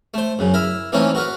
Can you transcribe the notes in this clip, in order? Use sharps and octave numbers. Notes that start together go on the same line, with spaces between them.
A3 C5
F#2 C#3
E4 A#4 E5
E3 A3 A#3 C4 C#4 D#4
F#4 A#4 B4